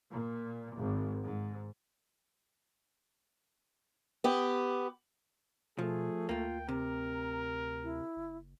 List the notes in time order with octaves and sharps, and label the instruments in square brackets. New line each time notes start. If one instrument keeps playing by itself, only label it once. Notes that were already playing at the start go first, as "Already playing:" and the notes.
[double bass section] A#2
G#1
G#2
[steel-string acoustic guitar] B3 G4
[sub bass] B2 [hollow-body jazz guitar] F3 [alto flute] A3 [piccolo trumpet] G#4
[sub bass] D2 [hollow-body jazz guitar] A#3 F4 [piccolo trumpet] G5
[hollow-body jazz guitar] C3 [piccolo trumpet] A#4 [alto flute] A#5
[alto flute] E4
[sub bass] F#1